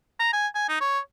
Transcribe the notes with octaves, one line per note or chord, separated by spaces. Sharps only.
A#5
G#5
G#5
D#4
C#5